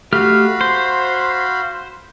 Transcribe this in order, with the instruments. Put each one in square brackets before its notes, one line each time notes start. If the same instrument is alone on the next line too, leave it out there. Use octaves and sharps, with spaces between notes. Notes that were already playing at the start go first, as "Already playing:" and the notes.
[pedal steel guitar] A3 G4 F6 [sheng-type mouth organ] F#4 F5 B5
[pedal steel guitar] C5